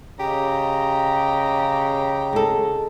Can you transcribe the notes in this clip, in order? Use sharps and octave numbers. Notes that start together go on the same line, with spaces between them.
C#3 G4 D#5 A#5
G#3 A4